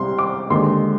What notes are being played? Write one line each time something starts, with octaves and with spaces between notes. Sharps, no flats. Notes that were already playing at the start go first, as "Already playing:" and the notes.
Already playing: C2 C3 G3 C6
D6
D#2 D3 G#3 C6